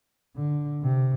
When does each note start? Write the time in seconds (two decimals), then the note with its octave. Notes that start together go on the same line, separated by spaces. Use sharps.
0.36 D3
0.83 C3